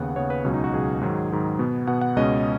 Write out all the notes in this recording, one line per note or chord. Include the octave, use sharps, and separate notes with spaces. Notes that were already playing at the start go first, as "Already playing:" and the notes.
Already playing: D#2 C#3 B3 F#5
D#2 C#3 B3 C#5
B4
C#2 B2 F#3 C#4
D#4
F#4
C#2 B2 F#3 G#4
G#2 D#3 F#3
G#2 D#3 F#3
B2 B3
B2 B3 F#5
F#5
C#2 B2 G#3 C#4 D#5